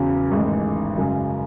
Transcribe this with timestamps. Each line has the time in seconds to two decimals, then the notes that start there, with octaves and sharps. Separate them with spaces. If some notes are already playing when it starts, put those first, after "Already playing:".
Already playing: E2 C#3 F#3 C#4
0.31 A1 G#2 D#3 G#3
0.97 F#2 C#3 G#3